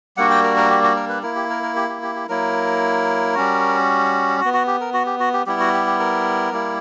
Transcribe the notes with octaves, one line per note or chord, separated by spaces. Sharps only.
G3 A#3 D4 F#4 F#5
G5
A#4
A#4
G4
F#4
A#4
B4
A#3 E4 A#4
G4
A#4
A#4
G4
G4
G4
G4
F#3 A#3 E4 A#4
G3 C#4 F#4
F#4
B3
F#4
G4
A#4
F#4
G4
F#4
G4
G3 B3 E4 G4
F#4
G4
G4
A#4
G3 A#3 E4